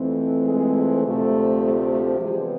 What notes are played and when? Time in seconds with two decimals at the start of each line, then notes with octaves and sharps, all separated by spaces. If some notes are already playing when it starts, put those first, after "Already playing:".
Already playing: F2 E3 A3 C4
0.46 G#3 G#4
1.04 D2 C3 F3 A3 C4
1.61 A3 A4
1.90 A3 A4
2.19 C3 E3 G#3 B3 D4 G#4